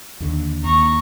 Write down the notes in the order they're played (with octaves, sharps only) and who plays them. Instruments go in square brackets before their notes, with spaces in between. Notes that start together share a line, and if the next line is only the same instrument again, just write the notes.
[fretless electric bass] D#2 D3
[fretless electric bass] D#2 [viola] A#5 C#6